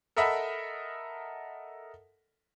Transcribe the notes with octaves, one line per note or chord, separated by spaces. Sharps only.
A4 A#4 D#5 E5 F#5 B5